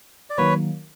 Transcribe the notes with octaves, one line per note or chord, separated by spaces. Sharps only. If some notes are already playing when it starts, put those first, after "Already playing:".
D5
D#3 F#3 A#3 B4 C#5